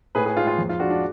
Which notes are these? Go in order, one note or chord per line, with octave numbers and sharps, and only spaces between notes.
A2 G#4 B4
G#4 B4
G#3 F4
F4
F2
F4
G#3 D4 F#4
D4